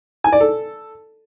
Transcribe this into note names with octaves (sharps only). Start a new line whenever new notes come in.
G#5
D5
A4